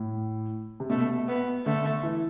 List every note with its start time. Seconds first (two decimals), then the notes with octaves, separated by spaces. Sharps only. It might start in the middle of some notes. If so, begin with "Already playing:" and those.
Already playing: A2
0.80 C3
0.90 B2 A3
1.28 B3
1.66 D3 A3
2.03 E3